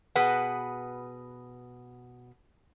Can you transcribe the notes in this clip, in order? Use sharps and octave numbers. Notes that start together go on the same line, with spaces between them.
B2 G#4 B4 F#5